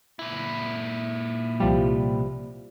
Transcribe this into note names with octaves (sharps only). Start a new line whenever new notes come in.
A#2 E4
C2 F3 G3